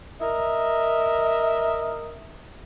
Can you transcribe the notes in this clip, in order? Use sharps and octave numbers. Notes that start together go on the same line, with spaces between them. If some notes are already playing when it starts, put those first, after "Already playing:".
A#4 D#5 E5